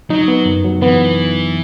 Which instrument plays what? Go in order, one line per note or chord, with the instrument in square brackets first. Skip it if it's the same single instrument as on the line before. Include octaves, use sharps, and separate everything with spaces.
[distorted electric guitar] F#3 [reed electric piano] D#4
[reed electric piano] B3
F#2
F#3
[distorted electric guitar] E3 [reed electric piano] B3